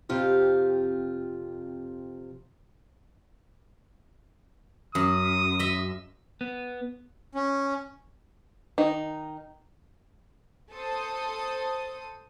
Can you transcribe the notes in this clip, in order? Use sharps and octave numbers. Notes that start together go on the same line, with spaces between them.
F2 C3 F4 G4
F#2 D#6
D#5 E5
B3
C#4
D#3 D#4
A4 C5 D#6